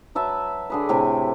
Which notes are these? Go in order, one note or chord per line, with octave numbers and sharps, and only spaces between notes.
F#3 B4 E5 A5
D3 G#4 B4
A2 C3 G4 G#5